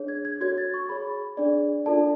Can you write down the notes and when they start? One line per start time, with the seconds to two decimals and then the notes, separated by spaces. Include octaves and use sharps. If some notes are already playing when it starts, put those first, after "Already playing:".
Already playing: D4 G#4 C#5
0.08 G#6
0.25 G#6
0.41 F#4 A4 C#5 G#6
0.58 A6
0.74 C#6
0.89 G#4 C#5 B5
1.37 D4 G#4 D5
1.86 D4 F4 A4 D5 A5